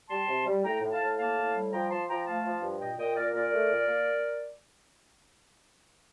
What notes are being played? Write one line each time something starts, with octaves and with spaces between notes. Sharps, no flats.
G3 A5 C6
C3
G3
A2 G5 A#5
A2
F5 A5
A2
A#3 F5 A5
A2
G3
F3 G5 A#5
F3 A5 C6
F3 G5 A#5
A3 F5 A5
F3
G2
A#2 D#5 G5
A#2 D#5 G5
A#2 A#4 D5
A#2 A#4 D5
A3
A#2
A#3